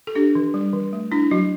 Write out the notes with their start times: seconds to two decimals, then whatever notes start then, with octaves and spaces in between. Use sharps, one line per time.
0.07 A4
0.15 D4 G4
0.35 E3
0.54 G3
0.73 E3
0.93 A3
1.12 D4 E4
1.31 F#3 F#4